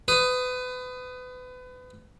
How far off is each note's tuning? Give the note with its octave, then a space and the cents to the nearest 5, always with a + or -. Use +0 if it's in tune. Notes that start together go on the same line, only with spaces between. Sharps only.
B4 +30 D#6 +0